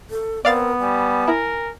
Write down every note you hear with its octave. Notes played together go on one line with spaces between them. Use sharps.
A4
B3 C4 A#4 D5 F5 A6
G3 G#5
E4 A#4